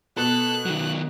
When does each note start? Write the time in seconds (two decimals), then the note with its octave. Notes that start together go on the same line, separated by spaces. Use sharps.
0.17 B2 A4 F#6
0.66 D#3 F#3